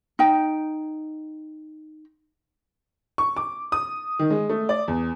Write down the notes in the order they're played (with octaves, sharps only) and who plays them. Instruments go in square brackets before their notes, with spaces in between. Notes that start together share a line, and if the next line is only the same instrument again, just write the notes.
[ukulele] D#4 G5
[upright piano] C#6
D6
D#6
D#3
G#3
A3
D5
E2